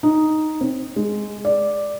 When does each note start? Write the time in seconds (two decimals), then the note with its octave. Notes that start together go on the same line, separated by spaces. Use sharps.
0.03 D#4
0.61 C4
0.96 G#3
1.45 D5